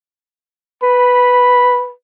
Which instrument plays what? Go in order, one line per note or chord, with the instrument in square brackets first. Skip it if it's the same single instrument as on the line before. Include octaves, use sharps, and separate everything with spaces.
[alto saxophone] B4 [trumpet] B5